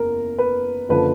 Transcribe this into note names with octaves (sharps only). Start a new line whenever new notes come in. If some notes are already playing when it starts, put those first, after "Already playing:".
Already playing: F#1 E2 A#4
B4
F#1 D3 F3 B4